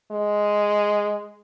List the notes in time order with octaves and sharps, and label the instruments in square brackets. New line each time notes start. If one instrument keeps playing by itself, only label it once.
[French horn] G#3